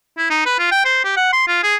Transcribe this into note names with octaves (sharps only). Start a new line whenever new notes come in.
E4
D#4
B4
F4
G5
C5
G4
F#5
C6
F4
G#4